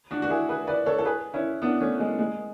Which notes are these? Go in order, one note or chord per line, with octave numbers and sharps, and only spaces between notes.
D4 F#4
F#4
E4 G#4
G#4 B4
B4 D5
A4 C#5
A4
G#4 B4
C#4 E4
B3 D4
A3 C#4
G#3
G#3